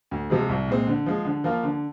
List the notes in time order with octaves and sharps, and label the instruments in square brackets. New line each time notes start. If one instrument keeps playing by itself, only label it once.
[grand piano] D2
C3 F3 G#3
C2
A#2 G#3 C4
D3
F3 G#3
D3
F3 A#3 F4
D3